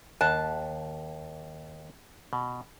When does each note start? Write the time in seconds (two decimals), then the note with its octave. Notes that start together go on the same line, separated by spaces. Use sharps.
0.21 D#2 A5 F#6
2.33 B2